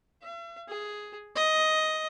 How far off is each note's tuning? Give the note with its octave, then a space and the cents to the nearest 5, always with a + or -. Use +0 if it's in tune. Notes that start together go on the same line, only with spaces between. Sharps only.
E5 +45
G#4 +5
D#5 +10